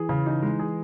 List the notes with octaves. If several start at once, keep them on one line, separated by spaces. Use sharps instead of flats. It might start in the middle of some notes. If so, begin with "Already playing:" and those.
Already playing: E3 G#4
C#3
D#4
G#3
G#4